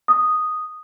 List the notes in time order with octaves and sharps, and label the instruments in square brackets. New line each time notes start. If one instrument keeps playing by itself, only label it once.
[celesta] D#6